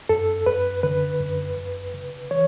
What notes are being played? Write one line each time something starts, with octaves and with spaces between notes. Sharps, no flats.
F#2 A4
F#2 B4
D3 B4
F#2
F#2
C#3
E3 C#5